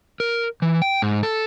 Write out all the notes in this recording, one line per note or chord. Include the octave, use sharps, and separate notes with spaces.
A#4
E3
G5
G#2
A4